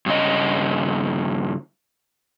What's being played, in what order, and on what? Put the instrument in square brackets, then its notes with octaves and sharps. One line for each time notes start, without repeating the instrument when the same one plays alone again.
[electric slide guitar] G2 C#3 D#5